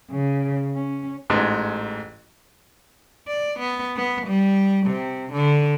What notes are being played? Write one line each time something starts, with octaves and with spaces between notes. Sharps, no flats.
C#3
C#4
A1 G#2
D5
B3
B3
G3
C3
D3